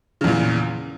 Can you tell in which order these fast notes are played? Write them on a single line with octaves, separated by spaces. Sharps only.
C#3 E2 A#2